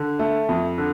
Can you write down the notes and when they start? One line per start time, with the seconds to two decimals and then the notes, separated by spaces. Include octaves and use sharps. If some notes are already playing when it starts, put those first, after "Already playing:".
Already playing: D3
0.19 A3
0.49 F2
0.78 D3